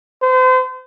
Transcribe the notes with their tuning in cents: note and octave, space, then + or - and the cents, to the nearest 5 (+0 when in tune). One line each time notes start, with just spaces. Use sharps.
C5 -35